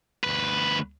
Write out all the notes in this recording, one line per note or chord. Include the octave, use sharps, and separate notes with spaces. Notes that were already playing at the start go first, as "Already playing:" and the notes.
D2 B4